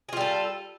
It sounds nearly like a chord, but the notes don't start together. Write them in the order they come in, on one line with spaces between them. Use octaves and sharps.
G#4 F4 G3 A4